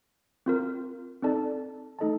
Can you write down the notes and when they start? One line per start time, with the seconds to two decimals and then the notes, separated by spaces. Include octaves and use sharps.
0.46 C4 F4 A#4
1.22 C4 D#4 A4 D5 A5
1.99 A3 D#4 A4 D#5 A5